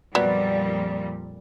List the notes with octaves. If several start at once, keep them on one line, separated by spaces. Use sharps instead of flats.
F2 A#2 F#3 G3 B3 D5